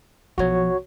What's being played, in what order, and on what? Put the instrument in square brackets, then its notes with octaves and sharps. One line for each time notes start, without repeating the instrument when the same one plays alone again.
[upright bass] B1 F3 [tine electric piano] F#4 C#5